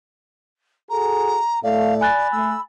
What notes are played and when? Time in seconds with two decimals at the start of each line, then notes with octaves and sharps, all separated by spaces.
0.90 F#4 G#4 A4 A#5
1.63 A2 A3 D5 F5
2.01 G#5 B5 F#6 A6
2.32 A3 E6